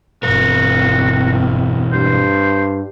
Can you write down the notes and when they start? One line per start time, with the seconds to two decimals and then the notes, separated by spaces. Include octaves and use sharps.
0.23 G1 E2 B2 C4 F#4 A#4
1.92 G2 C5